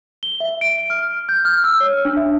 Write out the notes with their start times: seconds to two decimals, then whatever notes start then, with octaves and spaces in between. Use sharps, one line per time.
0.23 G7
0.40 E5
0.61 D7
0.90 F6
1.29 G6
1.45 F6
1.64 E6
1.80 C#5
2.05 D4
2.17 E5